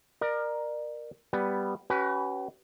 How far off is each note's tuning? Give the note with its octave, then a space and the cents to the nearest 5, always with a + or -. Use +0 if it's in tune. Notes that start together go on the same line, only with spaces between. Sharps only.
A#4 +10 D5 +35
G3 +0 B3 +0
C#4 +5 F#4 +45 B4 +0